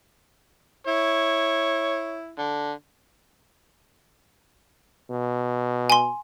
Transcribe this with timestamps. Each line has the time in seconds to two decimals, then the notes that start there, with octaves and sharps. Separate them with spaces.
0.87 E4 C#5
2.39 D3
5.11 B2
5.90 G#5 C6